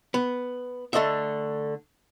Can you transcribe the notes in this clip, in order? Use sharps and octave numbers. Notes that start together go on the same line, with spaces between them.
B3
D3 A3 D#5 E5